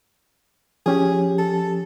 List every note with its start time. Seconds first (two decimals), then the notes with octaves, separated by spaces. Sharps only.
0.86 F3 C#4 G4 G#4
1.38 A4